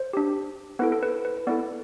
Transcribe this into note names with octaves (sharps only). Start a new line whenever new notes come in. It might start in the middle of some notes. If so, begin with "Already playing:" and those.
Already playing: C5
D4 G4
B3 E4 A4 B4
A4
B4
B4
B3 E4 A4 D5